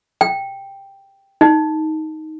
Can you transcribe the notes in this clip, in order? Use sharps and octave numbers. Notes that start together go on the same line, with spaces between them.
G5
D#4